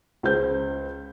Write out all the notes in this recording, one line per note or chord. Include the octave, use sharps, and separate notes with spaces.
C#2 G#4 C5 G6